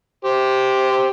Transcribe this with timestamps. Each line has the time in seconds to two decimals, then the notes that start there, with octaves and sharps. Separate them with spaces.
0.25 G4 C5